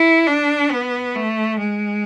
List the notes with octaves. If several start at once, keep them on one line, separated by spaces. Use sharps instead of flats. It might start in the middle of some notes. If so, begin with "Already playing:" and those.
Already playing: E4
D4
B3
A3
G#3